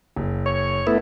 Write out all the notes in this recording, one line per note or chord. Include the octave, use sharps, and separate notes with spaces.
F#1
C#5
A3 B3 E4